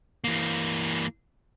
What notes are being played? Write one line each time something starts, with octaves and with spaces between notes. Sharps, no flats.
E3 A#3